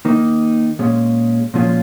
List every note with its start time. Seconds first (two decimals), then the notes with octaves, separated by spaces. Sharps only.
0.05 D#3 A#3 D#4
0.79 A#2 G#3 C#4
1.54 A#2 F3 G#3 C#4 F4